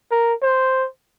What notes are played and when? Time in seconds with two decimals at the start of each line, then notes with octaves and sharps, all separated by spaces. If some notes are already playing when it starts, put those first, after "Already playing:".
0.11 A#4
0.43 C5